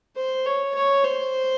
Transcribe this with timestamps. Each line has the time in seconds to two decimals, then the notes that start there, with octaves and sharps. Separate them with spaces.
0.16 C5
0.46 C#5
0.75 C#5
1.04 C5